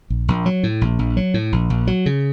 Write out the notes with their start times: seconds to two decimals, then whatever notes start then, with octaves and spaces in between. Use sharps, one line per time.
0.10 A#1
0.28 A#1
0.46 F#3
0.63 A2
0.81 A#1
0.99 A#1
1.17 F#3
1.34 A2
1.52 A#1
1.70 A#1
1.87 F#3
2.06 C#3